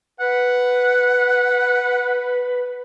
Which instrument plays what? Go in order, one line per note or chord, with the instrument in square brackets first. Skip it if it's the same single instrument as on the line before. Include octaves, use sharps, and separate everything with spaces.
[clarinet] B4 [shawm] F#5